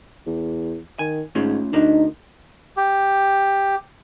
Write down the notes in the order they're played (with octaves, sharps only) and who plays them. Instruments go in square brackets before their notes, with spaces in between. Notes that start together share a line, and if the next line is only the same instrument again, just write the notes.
[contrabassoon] E2
[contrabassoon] D#3 [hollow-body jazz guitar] G#5
[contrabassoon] G#2 [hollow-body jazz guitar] A3 C#4 F4
[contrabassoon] D2 [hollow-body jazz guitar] D4 A#4 [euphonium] D#4
[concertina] G4